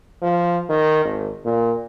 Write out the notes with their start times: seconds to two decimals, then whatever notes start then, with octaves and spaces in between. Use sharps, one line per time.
0.22 F3
0.69 D#3
1.05 G#1
1.45 A#2